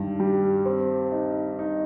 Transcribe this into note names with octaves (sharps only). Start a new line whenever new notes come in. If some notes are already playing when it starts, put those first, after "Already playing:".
Already playing: G2 D#3
G3
C4
D#4
D#4